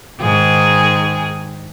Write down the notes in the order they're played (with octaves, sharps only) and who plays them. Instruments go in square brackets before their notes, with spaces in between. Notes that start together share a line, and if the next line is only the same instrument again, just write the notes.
[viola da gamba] G#2 D#3 G#4